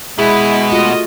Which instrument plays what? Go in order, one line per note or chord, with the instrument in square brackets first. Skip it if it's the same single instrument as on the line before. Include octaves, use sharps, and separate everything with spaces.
[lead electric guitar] B2 [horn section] G#3 [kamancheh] E4 [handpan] G#4
[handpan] A3 F4 F#4 [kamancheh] D#5